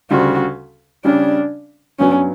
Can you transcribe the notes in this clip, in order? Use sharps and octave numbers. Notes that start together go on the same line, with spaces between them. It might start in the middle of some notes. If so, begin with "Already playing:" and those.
D2 C#3 G3 F#4
C#3 G3 C#4 D4
G2 F#3 B3 C#4